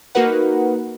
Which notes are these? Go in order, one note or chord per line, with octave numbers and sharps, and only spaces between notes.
A#3 D#4 F#4 A#4 B4 F#5